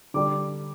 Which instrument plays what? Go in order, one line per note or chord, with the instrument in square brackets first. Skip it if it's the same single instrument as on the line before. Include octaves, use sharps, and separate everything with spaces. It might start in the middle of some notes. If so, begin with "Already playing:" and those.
[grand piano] D3 G3 D4 D6